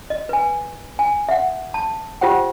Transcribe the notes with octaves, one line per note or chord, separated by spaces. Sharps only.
D#5
B4 G#5
G#5
E5 F#5
A5
F4 G4 C5 F#5 G5